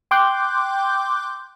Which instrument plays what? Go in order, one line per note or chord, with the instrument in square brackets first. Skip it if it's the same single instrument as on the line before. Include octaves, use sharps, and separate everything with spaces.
[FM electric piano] G5 C6 D6 F#6 G6